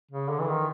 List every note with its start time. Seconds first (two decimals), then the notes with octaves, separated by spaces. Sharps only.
0.11 C#3
0.29 D3
0.40 E3
0.49 D#3